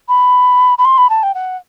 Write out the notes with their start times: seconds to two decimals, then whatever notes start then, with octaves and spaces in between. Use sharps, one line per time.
0.08 B5
0.78 B5
0.85 C6
0.98 B5
1.10 A5
1.23 G5
1.34 F#5